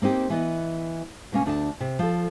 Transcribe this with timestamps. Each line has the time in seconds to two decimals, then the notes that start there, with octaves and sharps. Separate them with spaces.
0.02 A#3 C4 D#4 G4
0.30 E3 B3 D#5
1.32 B2 A#3 C#4
1.45 D2 D4 D#5 A5
1.80 C3
1.99 F3 A4